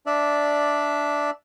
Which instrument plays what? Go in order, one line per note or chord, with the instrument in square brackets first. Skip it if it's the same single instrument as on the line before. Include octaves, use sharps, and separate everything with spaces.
[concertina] D4 D5 E5